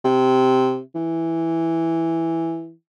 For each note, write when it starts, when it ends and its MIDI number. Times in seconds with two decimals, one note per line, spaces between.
0.05 0.80 48
0.95 2.71 52